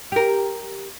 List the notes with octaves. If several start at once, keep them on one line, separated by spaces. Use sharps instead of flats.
G4 A#4